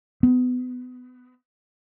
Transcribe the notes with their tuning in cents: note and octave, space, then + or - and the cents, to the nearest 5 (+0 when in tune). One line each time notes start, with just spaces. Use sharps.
B3 +25